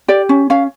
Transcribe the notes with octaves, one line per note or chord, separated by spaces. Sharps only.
G4 D5
C#4
C#4 F5